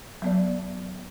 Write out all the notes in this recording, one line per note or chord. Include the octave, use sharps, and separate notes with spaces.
F#3 B3 D5